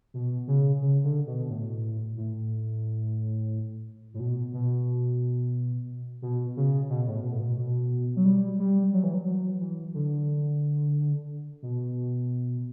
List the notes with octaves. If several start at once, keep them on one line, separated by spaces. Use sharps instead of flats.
B2
C#3
C#3
D3
B2
A2
A2
A2
B2
B2
B2
C#3
B2
A2
B2
A2
B2
B2
F#3
G3
G3
F#3
E3
F#3
F#3
E3
D3
B2